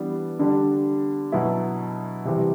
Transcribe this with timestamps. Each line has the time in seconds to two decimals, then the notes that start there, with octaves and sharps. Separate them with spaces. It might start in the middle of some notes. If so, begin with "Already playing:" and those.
Already playing: E3 G3 B3 D4
0.39 D3 G3 D4
1.32 B2 F#3 B3 E4
2.25 C3 E3 G3